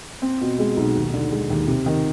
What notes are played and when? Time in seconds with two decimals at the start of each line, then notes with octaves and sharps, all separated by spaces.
0.22 C4
0.41 B2
0.59 G#3
0.77 B1
0.96 D#2
1.14 D3
1.32 G#3
1.50 D#2
1.67 C3
1.86 D#3